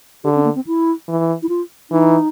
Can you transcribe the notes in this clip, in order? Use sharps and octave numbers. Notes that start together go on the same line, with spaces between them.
D3 G4
C#4
A#3
C4
E4
E3
E4
F4
E3 D#4